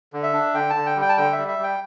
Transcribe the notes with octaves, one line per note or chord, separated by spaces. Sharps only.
D3
E5
D4
D3 G5
A5
D3
G5
G3
G5
A5
D3 G5
E5
G3
E5
G3 G5